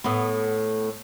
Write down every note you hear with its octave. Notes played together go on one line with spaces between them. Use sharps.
A2 B3